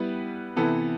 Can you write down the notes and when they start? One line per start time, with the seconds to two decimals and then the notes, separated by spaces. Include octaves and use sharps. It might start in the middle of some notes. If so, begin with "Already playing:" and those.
Already playing: G3 B3 E4 B4
0.56 C3 E3 B3 E4 A4